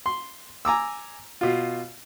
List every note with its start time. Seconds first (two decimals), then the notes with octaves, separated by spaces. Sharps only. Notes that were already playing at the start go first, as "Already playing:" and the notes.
0.06 C6
0.65 G#5 A#5 D6 E6
1.41 B2 F4